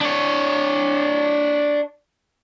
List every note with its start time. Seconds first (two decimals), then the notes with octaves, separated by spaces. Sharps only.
0.01 D4 C#5